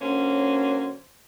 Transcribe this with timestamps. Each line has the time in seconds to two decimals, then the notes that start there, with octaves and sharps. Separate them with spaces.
0.01 D3 F#3 A#3 C#4 C5